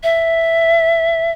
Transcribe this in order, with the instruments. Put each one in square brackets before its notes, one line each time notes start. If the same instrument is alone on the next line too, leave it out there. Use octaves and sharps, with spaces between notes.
[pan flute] E5